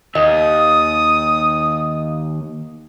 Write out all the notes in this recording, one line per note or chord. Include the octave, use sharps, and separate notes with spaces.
D#2 D#5 D#6